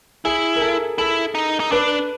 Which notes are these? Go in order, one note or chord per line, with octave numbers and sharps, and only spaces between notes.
E4 G#4
A#4
A4
E4 A4
D#4
D#4
D4 B4